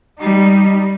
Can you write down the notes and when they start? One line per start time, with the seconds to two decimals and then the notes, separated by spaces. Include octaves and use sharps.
0.20 G3 D#4